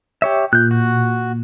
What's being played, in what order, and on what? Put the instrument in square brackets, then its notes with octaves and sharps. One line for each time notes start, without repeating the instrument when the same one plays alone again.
[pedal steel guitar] G4 C#5 E5
[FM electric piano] A#2 [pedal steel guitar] F#6 G6
[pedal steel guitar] F#4